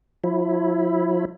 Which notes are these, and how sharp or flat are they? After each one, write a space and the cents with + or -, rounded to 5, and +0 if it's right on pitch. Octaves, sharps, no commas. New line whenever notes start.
F3 +40 E4 +0